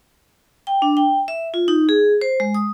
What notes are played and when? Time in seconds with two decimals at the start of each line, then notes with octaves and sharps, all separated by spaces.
0.67 G5
0.82 D4
0.97 G5
1.28 E5
1.54 F4
1.68 D#4
1.89 G#4
2.21 C5
2.40 G#3
2.54 D#6